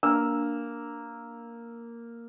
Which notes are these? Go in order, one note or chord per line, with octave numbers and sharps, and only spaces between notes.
A#3 D4 B4 E6